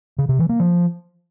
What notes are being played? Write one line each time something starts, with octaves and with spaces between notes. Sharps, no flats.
C#3
C3
E3
A#3
F3